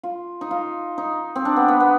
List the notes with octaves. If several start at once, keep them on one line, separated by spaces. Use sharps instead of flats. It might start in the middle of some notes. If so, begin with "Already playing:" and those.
F4
D#4
F4
D#4
C4
D4
B3
B3
B3